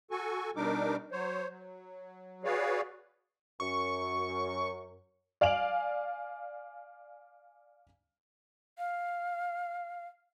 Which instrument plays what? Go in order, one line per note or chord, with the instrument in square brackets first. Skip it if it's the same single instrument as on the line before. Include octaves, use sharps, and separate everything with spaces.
[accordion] F#4 A4 G#5 C#6
B2 G3 D4 D#4 A#4 D6
F#3 C5 C#5
F#3
F#4 G#4 B4 C#5 D5 F5
[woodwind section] F#2 [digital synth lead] C#6
[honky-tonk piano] D5 F5 G#5 D7 F7 F#7
[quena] F5